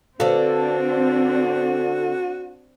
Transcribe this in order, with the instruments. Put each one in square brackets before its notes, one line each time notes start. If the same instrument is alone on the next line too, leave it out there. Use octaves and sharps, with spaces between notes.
[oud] D3 A4 [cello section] C4 D4 [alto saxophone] F#4 [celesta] B4 C5 F5